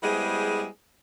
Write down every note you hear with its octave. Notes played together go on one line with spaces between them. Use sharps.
G3 G#3 B3 E4 G#4 C5